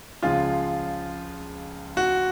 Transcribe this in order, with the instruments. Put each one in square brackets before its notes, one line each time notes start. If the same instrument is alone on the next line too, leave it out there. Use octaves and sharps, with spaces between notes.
[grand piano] C#2 C#3 F3 G#3 F4 G#4
F#4